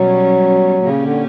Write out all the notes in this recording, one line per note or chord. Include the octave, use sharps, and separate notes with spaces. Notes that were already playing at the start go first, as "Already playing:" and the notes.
Already playing: B2 F#3 G3 C#4
A#2 C#3 A#3 C#4 G4
D3